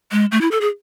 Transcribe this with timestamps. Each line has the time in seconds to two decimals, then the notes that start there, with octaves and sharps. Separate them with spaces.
0.12 G#3
0.32 A3
0.41 E4
0.51 A4
0.61 G#4